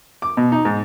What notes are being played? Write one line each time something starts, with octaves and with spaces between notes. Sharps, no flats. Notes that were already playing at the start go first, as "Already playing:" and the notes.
D6
B2
D#4
G#2